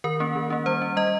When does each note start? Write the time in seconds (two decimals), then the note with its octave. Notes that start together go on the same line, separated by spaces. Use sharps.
0.04 D#3 A#4
0.20 A#3 C#4
0.36 D#3
0.50 A#3 C#4
0.66 G3 C5
0.82 C#4
0.96 G3 D#5